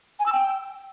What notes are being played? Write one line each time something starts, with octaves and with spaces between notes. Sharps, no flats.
G#5
E6
G5